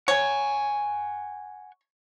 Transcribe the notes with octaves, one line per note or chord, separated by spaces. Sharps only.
C#5 F#5 G#5